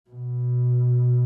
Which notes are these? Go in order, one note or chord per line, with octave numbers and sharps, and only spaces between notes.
B2